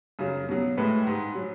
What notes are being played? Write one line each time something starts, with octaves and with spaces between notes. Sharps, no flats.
F#2 C#3 F#3
B2 F#3
A2 G#3 B4
G#2 G#3
F#3